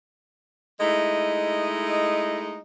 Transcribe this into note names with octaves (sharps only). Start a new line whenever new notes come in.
G#3 A3 D#4 E4 D#5